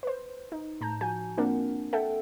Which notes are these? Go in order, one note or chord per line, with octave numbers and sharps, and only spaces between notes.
B4 C5
D#4
A2 A5 A#5 G6
F3 F#4 G#5 G6
A#3 C4 D4 F4 A#4 F#5
A4 E5 F#5 G5